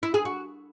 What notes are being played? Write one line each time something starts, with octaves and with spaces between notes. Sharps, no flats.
E4
G#4
F#4